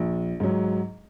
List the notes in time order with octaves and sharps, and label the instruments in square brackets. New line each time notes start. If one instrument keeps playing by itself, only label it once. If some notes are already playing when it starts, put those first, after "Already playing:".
Already playing: [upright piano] A#1
G#2 F#3